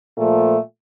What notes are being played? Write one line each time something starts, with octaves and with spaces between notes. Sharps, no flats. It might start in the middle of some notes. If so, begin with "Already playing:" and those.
A#2 F3 A3